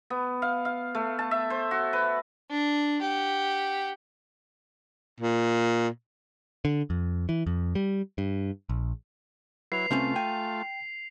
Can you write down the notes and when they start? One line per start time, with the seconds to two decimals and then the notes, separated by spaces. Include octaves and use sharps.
0.10 B3
0.42 F5
0.65 F5
0.95 A3
1.19 A5
1.31 E5
1.50 C5
1.71 F#4
1.93 B4
2.50 D4
3.01 G4 F#5
5.21 A#2
6.65 D3
6.90 F2
7.29 E3
7.47 F2
7.75 G3
8.18 G2
8.69 A#1
9.72 F#3 E4 B4 C7 F7
9.91 C2 A3 C4 C#4 F4
10.16 G5 G#5